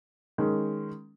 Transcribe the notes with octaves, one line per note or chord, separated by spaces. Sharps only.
D#3 G#3 C#4